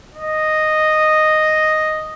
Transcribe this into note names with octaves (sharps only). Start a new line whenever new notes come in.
D#5